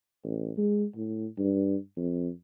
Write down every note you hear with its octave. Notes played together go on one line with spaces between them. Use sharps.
A1
G#3
A2
G2
F2